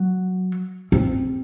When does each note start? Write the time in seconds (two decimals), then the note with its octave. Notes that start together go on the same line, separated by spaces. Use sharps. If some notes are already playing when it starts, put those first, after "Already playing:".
Already playing: F#3
0.92 C4